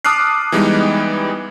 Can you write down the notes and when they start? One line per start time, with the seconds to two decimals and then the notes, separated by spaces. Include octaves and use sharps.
0.05 A5 D6 D#6 F6 F#6 C7
0.52 E3 G3 G#3 B3 D#4